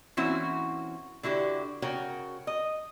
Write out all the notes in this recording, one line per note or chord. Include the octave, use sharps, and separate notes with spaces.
E3 A#3 C4 C#4 E4 F#4
D3 E4 F#4 G4
C#3 F#4 A#4 C#5 G5
D#5